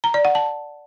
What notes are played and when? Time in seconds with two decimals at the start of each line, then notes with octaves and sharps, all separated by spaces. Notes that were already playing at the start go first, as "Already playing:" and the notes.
0.04 A#5
0.14 D5
0.25 F#5
0.35 A5